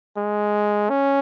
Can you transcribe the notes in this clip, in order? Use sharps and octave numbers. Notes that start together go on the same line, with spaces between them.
G#3
C#4